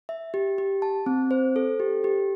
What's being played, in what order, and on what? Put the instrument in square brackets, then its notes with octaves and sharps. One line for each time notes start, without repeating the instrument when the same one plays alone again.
[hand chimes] E5
G4
G4
A5
C4
C5
A4
G4
G4